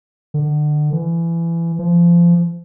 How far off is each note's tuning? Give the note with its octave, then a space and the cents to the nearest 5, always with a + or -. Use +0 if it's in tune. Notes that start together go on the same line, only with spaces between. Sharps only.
D3 +30
E3 +25
F3 -25